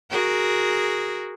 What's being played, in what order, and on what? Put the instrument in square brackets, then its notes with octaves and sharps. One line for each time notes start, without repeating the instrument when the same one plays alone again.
[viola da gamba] F#4 G#4 A#4